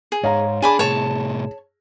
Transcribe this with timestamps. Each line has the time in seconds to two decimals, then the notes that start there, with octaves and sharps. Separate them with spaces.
0.12 G#4
0.24 G#2 C#5 F5 A#5
0.62 D4 G#4 G#5 B5 D6
0.79 A2 C3 C#5 A5